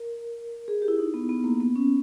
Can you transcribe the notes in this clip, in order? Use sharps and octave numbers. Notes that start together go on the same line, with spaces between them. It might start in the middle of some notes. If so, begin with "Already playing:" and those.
Already playing: A#4
G#4
G4
E4
D#4
B3
B3
A#3
B3
C#4